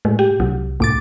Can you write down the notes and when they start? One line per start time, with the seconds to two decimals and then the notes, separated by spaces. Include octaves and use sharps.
0.05 A2 G#3
0.19 G4
0.40 C2 F#3
0.80 C2 A2 D6 A6